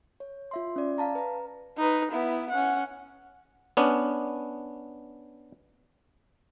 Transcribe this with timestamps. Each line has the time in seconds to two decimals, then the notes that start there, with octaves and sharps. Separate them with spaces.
0.20 C#5
0.51 F4 E5 C6
0.76 C#4 D5
0.98 F5 A5 A#5
1.15 B4 A#5
1.77 D#4 B4
2.11 B3 E4
2.50 C#4 F#5
3.77 B3 C#4 D4